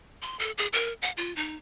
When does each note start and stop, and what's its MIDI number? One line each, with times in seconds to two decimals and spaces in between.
0.22 0.38 84
0.39 0.51 69
0.58 0.67 68
0.73 0.93 70
1.02 1.11 78
1.17 1.34 65
1.36 1.56 63